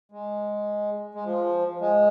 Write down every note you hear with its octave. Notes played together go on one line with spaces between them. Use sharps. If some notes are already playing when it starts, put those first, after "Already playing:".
G#3
G#3
F3
G#3